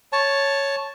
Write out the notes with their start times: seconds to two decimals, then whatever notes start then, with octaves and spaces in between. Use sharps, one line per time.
0.13 C#5 A5